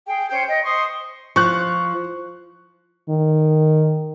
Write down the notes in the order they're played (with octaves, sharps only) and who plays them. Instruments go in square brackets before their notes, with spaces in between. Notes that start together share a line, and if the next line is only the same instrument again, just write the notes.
[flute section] G#4 G5
C#4 C5 G5 G6
D#5 G5
C5 C6 C#6 D#6
[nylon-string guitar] F3 [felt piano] C#6 F#6
[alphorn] D#3